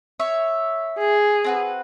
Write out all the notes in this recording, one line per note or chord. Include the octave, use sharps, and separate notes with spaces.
C#5 E5
G#4
C4 F#4 B4